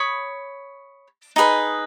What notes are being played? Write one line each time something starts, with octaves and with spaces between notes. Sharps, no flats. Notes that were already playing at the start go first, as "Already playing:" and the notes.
Already playing: C#5 B5 D#6
D#4 G#4 B4 D#5